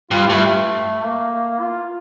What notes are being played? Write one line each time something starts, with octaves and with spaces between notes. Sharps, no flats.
G2 F4
G2 A3
A#3
F4